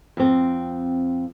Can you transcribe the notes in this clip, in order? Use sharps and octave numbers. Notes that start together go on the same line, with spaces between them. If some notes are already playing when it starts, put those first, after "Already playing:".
F2 C4